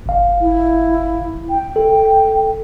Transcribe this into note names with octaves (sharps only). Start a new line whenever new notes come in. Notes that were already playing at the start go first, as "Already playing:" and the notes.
G1 F5
E4
G5
A4